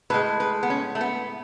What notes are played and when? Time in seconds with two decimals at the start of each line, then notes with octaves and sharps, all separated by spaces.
0.10 A2 G#3 B4
0.40 B4
0.63 B3
0.70 C#4
0.95 A3
1.01 B3